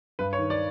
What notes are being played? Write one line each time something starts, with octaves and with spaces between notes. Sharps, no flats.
G2 B4
C#5
D#3
D5